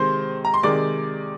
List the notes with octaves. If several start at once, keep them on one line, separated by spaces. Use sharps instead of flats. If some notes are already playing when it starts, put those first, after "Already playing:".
Already playing: C3 D#3 G#3 C5 C6
A#5
C6
C3 D#3 G#3 D5 D6